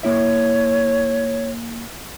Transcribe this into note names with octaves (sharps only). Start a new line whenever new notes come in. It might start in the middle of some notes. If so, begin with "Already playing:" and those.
A#3 E4 C#5 E5